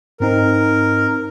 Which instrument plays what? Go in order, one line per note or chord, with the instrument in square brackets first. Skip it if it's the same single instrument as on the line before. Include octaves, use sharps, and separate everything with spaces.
[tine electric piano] G#2 C4 D#4 [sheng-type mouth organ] A#4